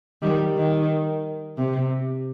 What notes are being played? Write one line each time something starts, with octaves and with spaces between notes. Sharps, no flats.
D#3 G3
D#3
C3